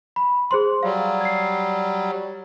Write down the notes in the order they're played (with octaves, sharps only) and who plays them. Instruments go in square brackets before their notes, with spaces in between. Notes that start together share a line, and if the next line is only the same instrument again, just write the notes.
[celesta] B5
G#4 C5 C6
[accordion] F#3 G3 [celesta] F5
[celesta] G#6 C7